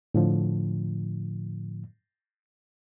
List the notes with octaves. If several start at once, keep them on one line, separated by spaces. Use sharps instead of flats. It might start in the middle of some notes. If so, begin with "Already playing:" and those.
A2 D3 F3